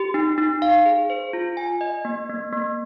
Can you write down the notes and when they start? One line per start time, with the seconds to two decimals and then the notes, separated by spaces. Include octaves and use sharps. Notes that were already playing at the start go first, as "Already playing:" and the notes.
Already playing: G4
0.14 D#4
0.38 D#4
0.62 F5
0.86 G#4
1.10 C5
1.33 F4
1.57 G#5
1.81 D#5
2.05 A#3
2.29 A#3
2.53 A#3